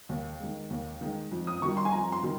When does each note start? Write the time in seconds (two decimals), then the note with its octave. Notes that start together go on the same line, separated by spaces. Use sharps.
0.09 D#2
0.40 D#3 G#3
0.70 D#2
1.01 D#3 G#3
1.32 F2
1.47 D#6
1.61 D#3 G3 C#6
1.77 C6
1.85 G#5
1.92 F2 A#5
2.12 C6
2.23 D#3 G3